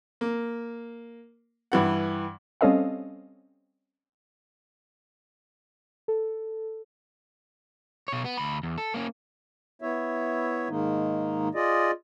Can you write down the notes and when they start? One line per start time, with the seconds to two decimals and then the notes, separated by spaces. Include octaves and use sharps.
0.21 A#3
1.72 G2 E3 F#5
2.61 G3 C4 C#4 A4 D#5 F5
6.08 A4
8.08 B2 C#5
8.25 B3
8.37 D2 B5
8.63 E2
8.78 A4
8.94 A#3 C#4
9.82 B3 E4 C#5 E5
10.69 G#2 D#3 G#3 A#3 D#4
11.54 F4 G#4 D5 D#5